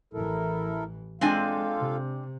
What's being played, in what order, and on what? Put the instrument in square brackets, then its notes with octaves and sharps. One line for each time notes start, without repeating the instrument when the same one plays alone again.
[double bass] A1 E3 [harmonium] E4 A4 A#4
[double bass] G#3 [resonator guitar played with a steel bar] C4 D4 G#5 [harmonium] F4 A4 F5
[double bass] C3